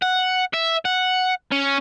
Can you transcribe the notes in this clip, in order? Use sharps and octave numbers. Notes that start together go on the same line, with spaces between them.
F#5
E5
F#5
C#4